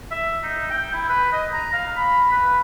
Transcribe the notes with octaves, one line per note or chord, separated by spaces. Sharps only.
E5
D#4
G5
E4
B4
D#5
A#5
F5
B5
B4